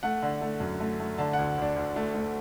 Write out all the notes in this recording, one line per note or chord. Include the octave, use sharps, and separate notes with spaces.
A3 F#5
D3
A3
F#2
A3
A3
D3 A5
F#5
D2
D2 D4
D2
A3
A3